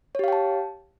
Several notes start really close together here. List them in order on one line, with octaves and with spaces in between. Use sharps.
C#5 G4 F5 G5 A5